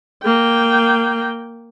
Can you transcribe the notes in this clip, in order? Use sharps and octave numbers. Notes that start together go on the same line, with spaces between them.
A#3 G5